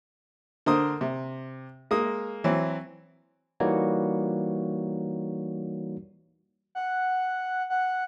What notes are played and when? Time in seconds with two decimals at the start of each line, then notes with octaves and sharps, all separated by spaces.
0.66 D3 A#4 C5 D#6
1.01 C3
1.91 G#3 A#3 D#6
2.44 E3 F#3 C4
3.60 E3 G3 A#3 D#4 F#4 C#5
6.75 F#5
7.70 F#5